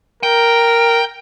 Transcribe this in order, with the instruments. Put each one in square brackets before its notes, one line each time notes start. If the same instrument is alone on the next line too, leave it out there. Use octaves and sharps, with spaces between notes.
[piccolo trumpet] A#4 [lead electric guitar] G5